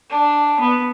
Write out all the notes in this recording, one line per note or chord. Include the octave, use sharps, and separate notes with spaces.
D4
B3